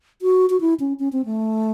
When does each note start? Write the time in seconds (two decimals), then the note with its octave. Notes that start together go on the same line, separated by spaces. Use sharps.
0.22 F#4
0.50 F#4
0.61 E4
0.80 C#4
0.99 C#4
1.13 C4
1.25 A3